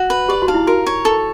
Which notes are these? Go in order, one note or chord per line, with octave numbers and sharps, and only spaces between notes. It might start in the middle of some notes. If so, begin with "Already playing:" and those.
Already playing: F#4
B4
G4 D5
F#4
D#4 F5
E4
F#4 A#4
C#5
A4